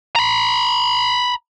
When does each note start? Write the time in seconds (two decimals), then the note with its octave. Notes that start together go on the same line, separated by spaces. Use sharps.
0.16 A#5 B5